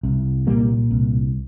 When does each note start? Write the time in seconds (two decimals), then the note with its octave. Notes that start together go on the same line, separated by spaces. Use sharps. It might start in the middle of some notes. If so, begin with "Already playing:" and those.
0.03 C2
0.47 A#2 G3 A#3
0.91 C2